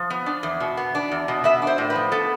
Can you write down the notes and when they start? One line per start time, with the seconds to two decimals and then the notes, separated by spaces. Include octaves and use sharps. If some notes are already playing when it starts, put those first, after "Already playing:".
Already playing: F3
0.10 B3
0.26 D4
0.43 E2
0.60 B2
0.77 B3
0.95 D4
1.12 E2
1.28 B2
1.44 B3 E5
1.62 D4
1.67 C5
1.78 A2
1.90 B4
1.96 F3
2.12 B3 A4